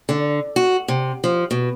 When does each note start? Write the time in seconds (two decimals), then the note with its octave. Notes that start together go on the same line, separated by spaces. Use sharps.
0.09 D3
0.56 F#4
0.88 C3
1.24 F3
1.51 B2